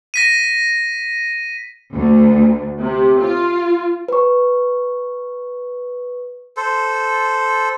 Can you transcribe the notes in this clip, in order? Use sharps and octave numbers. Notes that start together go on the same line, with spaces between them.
A#6 B6 D#7
D2
C3
F4
B4 C#6
A4 C5